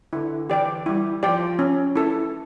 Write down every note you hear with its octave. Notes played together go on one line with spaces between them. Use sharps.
D3 E4
E3 G4 D5 G5
G3 E4
F3 G4 D5 G5
C#4
E4 A4